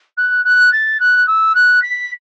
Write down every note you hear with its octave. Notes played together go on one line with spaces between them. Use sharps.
F#6
F#6
A6
F#6
E6
F#6
B6